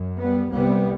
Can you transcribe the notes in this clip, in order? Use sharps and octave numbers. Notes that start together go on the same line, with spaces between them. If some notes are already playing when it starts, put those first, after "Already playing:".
Already playing: F#2
G3 B3
C2 C3 G3 B3